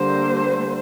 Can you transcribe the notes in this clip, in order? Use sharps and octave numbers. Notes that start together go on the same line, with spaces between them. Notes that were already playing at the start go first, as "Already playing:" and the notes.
Already playing: D3 G3 A#3 C5